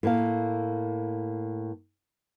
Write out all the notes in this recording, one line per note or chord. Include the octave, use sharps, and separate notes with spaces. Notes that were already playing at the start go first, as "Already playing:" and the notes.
A2 A#3 F5